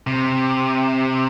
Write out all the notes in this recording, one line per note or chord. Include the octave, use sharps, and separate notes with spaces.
C3